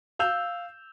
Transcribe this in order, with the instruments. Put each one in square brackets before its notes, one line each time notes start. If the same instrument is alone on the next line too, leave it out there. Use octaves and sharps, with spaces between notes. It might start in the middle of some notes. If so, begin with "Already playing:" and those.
[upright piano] F5 E6 G6 F7